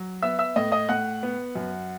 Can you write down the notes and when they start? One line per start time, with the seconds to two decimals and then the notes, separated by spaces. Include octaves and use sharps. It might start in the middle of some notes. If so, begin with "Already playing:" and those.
Already playing: F#3
0.22 B3 E5 E6
0.39 E5 E6
0.56 A2 D#5 D#6
0.72 D#5 D#6
0.89 A2 F#5 F#6
1.23 B3
1.55 F#2